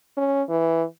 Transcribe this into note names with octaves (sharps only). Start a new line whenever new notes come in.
C#4
E3